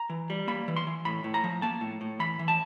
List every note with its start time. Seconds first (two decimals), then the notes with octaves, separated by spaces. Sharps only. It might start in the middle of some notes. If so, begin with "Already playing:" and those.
Already playing: A#5
0.10 E3
0.30 G3
0.48 A#3 B5
0.68 E3
0.76 C6
0.87 E3
1.05 A2 B5
1.24 A2
1.34 A#5
1.44 F3
1.62 A#3 A5
1.81 A2
2.01 A2
2.19 E3 B5
2.39 E3
2.48 A5